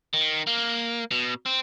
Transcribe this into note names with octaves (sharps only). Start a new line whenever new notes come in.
D#3
A#3
B2
C4